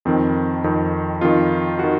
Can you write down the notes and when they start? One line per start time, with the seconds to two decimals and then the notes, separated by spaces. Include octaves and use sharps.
0.05 F2 D#3 C4
0.64 F2 D#3
1.21 F2 D#3 F4
1.79 D#3 F#4